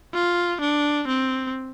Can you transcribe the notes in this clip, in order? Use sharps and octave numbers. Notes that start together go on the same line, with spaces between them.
F4
D4
C4